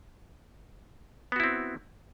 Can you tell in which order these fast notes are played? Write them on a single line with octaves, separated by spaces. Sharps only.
B3 F#4 E4 C4